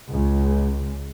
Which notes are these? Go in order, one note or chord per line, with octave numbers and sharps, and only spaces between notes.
C#2